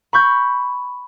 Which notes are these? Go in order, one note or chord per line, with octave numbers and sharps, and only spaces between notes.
B5 C#6 G6